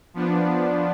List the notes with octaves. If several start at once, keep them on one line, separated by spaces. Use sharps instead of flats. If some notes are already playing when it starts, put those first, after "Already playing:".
F3 B3 D4